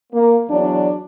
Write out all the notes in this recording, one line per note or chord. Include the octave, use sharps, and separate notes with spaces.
A#3
E2 F#3 D4